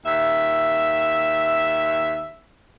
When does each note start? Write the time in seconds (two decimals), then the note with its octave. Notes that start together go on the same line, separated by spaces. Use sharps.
0.05 D#2 E5